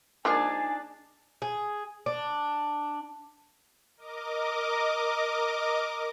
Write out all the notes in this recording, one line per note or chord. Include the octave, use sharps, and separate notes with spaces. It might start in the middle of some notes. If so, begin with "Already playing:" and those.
F3 G#3 A#3 D4 D#4 G#4 G#5 A5
G#4
D4
A#4 D#5 D6